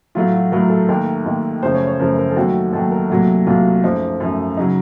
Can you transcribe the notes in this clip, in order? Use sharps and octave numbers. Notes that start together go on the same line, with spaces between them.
A2 F#3 A3 F4
F#4
A2 F#3 A3 A#4
A4
D#2 D#3 A3 A#4
D#2 D#3 A3
F#2 C#3 F3 A3 C5
C#5
C#5
F#2 C#3 F3 A3 A#4
A#4
A4
D#2 D#3 F#3 A3 F#4
D#2 D#3 F#3 A3 A4
A#4
C2 A#2 F#3 A3 F#4
C2 A#2 F#3 A3 F4
F#2 F3 A3 D#4
F#2 F3 A3
C#3 F#3 D#4